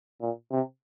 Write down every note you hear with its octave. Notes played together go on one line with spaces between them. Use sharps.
A#2
C3